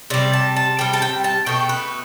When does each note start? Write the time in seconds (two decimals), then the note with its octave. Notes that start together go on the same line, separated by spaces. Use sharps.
0.10 C3 G3 D5
0.33 A5
0.56 A5
0.79 C3 G3 G5
0.93 A5
1.02 G5
1.24 A5
1.46 B2 A3 G5
1.69 B4